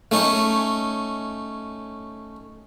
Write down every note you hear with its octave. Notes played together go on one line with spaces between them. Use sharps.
A3 C#4 D#4